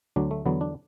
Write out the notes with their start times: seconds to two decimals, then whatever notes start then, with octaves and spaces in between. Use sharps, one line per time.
0.16 D2 D3 F#3 D4
0.31 A3
0.45 E2 D3 F#3 B3
0.61 D4